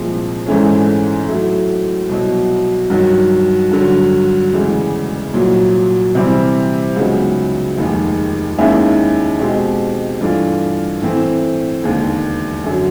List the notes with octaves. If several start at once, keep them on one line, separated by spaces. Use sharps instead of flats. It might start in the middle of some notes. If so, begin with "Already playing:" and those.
Already playing: C2 A#2 F3 G#3 C4
G#1 G#2 E3 A3 C#4
A2 F#3 A3
C2 B2 F#3
G2 D#3 F#3
G2 D3 F#3
E1 D2 C#3 E3 G#3
C2 A#2 F#3
C3 E3 G3 C4
C#2 C#3 F#3 B3 D#4
F1 D#2 D#3 G#3
D#2 D#3 G#3 C#4 E4
B2 G#3 C4 D#4 G4
G2 E3 A3 D4 F4
A2 E3 A3 C4
E1 D#2 D3
F#2 D3 F#3